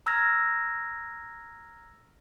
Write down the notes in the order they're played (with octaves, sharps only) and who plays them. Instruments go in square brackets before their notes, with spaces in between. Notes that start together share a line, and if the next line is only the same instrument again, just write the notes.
[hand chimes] A#5 E6 F6 G#6 A#6